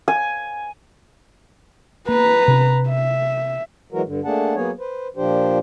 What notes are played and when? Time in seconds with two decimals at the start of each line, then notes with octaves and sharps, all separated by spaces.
0.08 G#5
2.09 A#3 B4 A#5
2.48 C3 D4
2.89 E5
3.92 E3 F#3 G#3 F#4 A#4
4.06 G2 D3
4.25 A3 A#3 D4 G#4 F#5 A5
4.55 F#3 A#3 B3 G#4 C#5
4.79 B4 C5
5.17 A#2 F3 D4 G4 C5